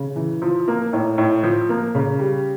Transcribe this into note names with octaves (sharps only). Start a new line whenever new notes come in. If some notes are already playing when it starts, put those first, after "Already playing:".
Already playing: C#3
E3
F3
A#3
A2
A2
F3
A#3
C#3
G3